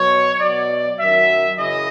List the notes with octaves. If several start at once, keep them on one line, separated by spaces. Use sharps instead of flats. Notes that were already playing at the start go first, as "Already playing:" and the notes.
Already playing: B2 F#3 C#5
B2 F#3 D5
F#2 D#3 F#3 E5
F#2 C#3 E3 D#5